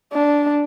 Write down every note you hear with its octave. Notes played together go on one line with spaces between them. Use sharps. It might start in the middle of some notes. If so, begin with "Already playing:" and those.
D4